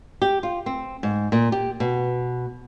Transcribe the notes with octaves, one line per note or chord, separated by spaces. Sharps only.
G4
F4
C4
G#2
A#2
G4
B2